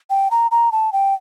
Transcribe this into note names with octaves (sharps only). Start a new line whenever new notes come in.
G5
A#5
A#5
A5
G5